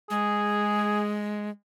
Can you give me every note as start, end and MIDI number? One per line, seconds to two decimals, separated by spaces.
0.10 1.49 56
0.10 1.16 68